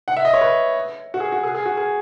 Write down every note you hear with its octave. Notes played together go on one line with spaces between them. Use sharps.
F#5
E5
D#5
C#5
B4
F#4
G#4
F#4
G#4
G#4
F#4
G#4